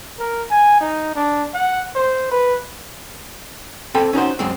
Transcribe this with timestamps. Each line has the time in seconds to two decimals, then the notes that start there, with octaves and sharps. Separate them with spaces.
0.19 A#4
0.50 G#5
0.80 D#4
1.15 D4
1.54 F#5
1.95 C5
2.31 B4
3.94 C4 A4 G5 B5
4.13 C#4 D#4 F#4 C5
4.39 F#2 G#3 C4